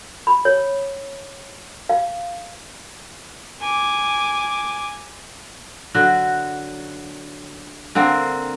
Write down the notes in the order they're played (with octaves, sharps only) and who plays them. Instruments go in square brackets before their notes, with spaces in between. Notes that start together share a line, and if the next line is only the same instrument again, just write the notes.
[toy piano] B5
C#5
F5
[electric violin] G#5 D6
[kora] D3 F#3 F#4
D3 A#3 C4